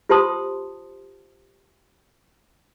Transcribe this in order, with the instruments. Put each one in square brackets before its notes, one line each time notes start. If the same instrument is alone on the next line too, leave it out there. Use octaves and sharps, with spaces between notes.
[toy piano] F4 G4 C5 A5 C6 D#6